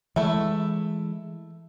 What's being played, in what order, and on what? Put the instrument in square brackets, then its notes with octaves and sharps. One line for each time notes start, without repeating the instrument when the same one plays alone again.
[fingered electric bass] E3 G#3 [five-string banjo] A3 E4